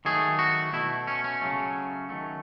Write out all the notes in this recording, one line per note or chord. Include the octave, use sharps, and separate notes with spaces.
D#3 F#3 A3 G#4
F#4
B2 A3 E4
C#4
C#4
C#3 F#3 A3
D#3 F#3 A3